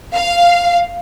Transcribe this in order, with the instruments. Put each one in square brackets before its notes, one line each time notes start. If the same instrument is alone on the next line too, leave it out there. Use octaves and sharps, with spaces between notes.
[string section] F5